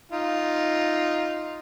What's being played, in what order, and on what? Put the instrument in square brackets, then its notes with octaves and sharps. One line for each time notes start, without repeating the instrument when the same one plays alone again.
[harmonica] D#4 F4